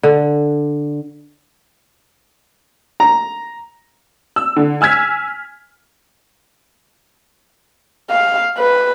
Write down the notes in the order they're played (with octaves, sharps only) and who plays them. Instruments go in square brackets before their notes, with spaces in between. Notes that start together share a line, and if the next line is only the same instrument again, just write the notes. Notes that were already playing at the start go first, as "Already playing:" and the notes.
[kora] D3
[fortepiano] A#5
[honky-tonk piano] E6
D3
G#5 E6 F6 G#6 B6
[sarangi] F5
B4